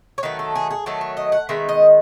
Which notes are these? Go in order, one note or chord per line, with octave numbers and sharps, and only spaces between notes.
C#5
D#3 F#3 A3 B4
A4
G#4
G#4
D#3 F#3 A3 A4
C#5
D#5
F#5
D#3 G#3 B3 E5
D#5